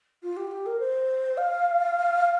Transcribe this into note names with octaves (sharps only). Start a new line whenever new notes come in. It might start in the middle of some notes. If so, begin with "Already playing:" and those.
F4
G4
F4
G4
A#4
C5
F5